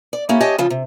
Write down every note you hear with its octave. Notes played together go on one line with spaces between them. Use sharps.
D5
A#3 C#4 E4 G4 A4
G4 C#5 D#5 G#5 A5
C#3 F3 F4 A4
C3